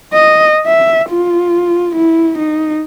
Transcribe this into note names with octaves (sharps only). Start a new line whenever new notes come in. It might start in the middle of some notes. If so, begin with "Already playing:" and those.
D#5
E5
F4
E4
D#4